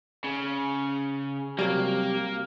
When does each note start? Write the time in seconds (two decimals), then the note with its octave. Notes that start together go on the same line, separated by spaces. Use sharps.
0.24 C#3
1.59 C3 F#3 G3 A#3